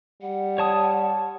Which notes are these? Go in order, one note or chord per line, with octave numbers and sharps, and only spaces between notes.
G3 F#5
C#5 A5 D#6